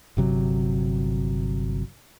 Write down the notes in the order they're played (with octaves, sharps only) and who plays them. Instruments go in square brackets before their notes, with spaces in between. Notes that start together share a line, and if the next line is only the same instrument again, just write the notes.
[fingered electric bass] G1 C3 F#3